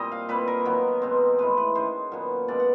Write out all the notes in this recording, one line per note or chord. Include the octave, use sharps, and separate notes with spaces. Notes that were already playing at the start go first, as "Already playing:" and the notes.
Already playing: A#2 G3 C4 D#5
F5
A#2 G3 C4 B4
A#4
D#3 F#3 B3
B2 G#3 C4
A2 E3 G#3 B4
B4
D#3 G#3 C#4 C5
A#2 F#3 B3
B2 G#3 C#4 D5
F#5